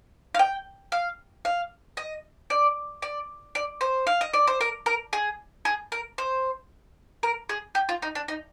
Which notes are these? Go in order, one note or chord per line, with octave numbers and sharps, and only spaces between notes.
F5
G5
F5
F5
D#5
D5
D5
D5
C5
F5
D#5
D5
C5
A#4
A#4
G#4
G#4
A#4
C5
A#4
G#4
G4
F4
D#4
D4
D#4